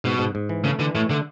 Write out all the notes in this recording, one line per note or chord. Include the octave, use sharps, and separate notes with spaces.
G#2 B2
G#2
G#2
E3
C#3 A3
D3 E3
A2 A3
D3 A3